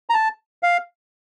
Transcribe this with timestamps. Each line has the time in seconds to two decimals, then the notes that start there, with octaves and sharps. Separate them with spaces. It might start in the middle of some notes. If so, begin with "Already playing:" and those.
0.10 A#5
0.14 A5
0.63 F5